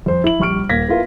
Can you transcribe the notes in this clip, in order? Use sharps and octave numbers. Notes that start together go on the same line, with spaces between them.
F2 C5
E4 F#7
A#1 G3 C#6 F6 D7
D#1 A#3 G#6 A#6 B6
B3 E4 F4 A#4